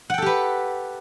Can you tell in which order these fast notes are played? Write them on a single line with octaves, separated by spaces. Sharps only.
F#5 G5 A4 G4 B4